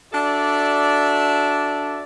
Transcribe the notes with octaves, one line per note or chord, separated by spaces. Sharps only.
D4 F#4 A4 D5 E5